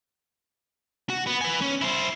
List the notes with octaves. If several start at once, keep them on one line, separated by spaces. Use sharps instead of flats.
F#4
B3
B4 G#5
C#4
E4 C5